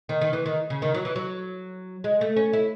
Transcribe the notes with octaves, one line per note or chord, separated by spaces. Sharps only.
D#3
D#3
E3
D#3
C#3
D#3
F#3
E3
F#3
G#3
A3
C#4
E4